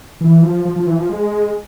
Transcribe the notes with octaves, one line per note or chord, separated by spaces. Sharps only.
E3
F3
F3
F3
E3
F3
G#3